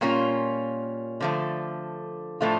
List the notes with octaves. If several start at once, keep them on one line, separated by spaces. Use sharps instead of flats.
A#2 G3 A#3 C#4 F4
D3 F3 A3
A2 F3 A3 D4 F4